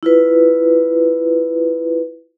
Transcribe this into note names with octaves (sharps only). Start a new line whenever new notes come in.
E4 F4 B4